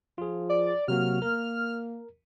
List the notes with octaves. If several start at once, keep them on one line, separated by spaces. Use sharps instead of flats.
F3 F4 G#4
D5
C3 F#3 A#3 F#4 F6
A#3 A#4